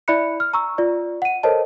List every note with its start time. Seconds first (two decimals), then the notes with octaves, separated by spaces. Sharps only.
0.08 E4 D5 E5 B5 F#6 C#7
0.40 F6
0.53 A#5 C#6 E6
0.78 F4 D5
1.22 F#5 D#7
1.43 A4 A#4 C5 C#5 D#5 A5